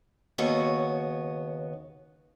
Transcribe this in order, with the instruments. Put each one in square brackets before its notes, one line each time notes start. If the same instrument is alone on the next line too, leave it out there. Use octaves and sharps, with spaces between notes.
[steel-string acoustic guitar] D#2 C#3 B3 F#4 C#5